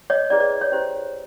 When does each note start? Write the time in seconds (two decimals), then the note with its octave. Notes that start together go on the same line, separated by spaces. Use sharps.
0.10 C#5 D#5
0.30 C#4 E4 G#4 B4 D5
0.40 D5
0.61 C#5
0.72 C#4 E4 G4 C5